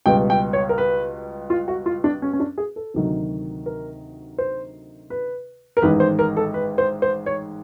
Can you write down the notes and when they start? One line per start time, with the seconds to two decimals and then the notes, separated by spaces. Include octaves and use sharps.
0.06 C#2 B2 G3 G5
0.30 G5
0.53 C#5
0.69 A#4
0.78 B4
1.50 F4
1.68 F#4
1.86 F4
2.04 D4
2.22 C#4
2.33 C#4
2.40 D4
2.58 G#4
2.76 A4
2.94 D2 C3 D#3 F#3
3.66 A#4
4.38 C5
5.10 B4
5.77 A#4
5.82 A1 G#2 D#3 B4
6.00 C5
6.19 A#4
6.37 A4
6.54 B4
6.78 C5
7.02 C5
7.26 C#5